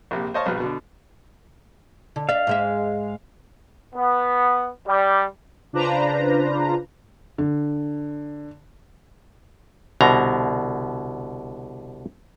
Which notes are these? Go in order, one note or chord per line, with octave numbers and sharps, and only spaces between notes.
A#1 C3 A#3
C5 C#5 D#5 F5 A5 C#6
A#1 G2 B2 B4 F6
B2 D3
D3
D5 E5 F5
G#2 G#3 E5
B3
G3
C#3 D4 F4 B4 C5 A#5
D3
C2 B2 D3 A#5